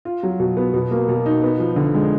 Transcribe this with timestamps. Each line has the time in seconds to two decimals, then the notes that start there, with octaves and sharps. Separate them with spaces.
0.05 F4
0.23 F#3
0.40 B2
0.57 B3
0.73 B2
0.91 A#3
1.08 B2
1.26 D#4
1.42 B3
1.59 F3
1.76 D3
1.94 G#3